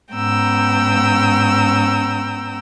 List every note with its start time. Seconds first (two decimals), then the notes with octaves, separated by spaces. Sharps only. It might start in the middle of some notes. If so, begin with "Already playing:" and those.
0.12 G#2 B3 C#4 G5 A#5 E6